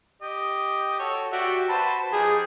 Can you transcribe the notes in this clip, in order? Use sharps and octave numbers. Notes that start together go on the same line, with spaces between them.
G4 D#5
F#4 A4 C#5
F#4 G4 D5 E5
F#4 B4 C5 A5
F3 D#4 G4 G#4